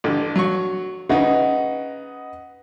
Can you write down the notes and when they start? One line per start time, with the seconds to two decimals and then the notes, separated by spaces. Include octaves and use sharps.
0.04 A1 D3
0.36 F#3 C#6
1.09 C#3 D#4 B4 D#5 F#5